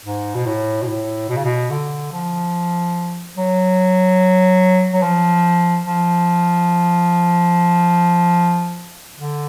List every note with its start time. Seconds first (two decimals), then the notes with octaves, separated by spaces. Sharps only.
0.05 G#2
0.35 B2
0.46 A2
0.82 B2
0.87 A2
1.29 B2
1.37 C#3
1.44 B2
1.70 D3
2.12 F3
3.37 F#3
4.93 F#3
5.02 F3
5.85 F3
9.18 D3